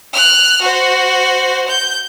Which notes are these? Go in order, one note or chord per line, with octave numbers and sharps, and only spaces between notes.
F6 F#6
F#4 C5
G6